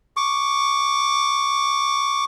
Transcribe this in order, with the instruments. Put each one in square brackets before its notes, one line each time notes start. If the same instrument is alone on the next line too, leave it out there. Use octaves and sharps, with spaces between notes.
[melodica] C#6 D6